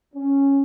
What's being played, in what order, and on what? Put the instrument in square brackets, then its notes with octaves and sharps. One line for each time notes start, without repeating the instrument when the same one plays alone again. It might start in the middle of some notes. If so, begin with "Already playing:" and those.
[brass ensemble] C#4